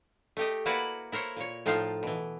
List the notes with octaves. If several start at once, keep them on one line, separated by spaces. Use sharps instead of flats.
A3 G4 D#5
A#3 E4 F#4 B4 D5 F#5
E4 A#4 C5 C#5
A#2 C#5
A2 F3 D#4 F4 F5 A5
B2 E3